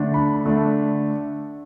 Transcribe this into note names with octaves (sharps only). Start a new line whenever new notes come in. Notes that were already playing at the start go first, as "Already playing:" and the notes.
Already playing: D3 A3 D4
B5
D3 A3 D4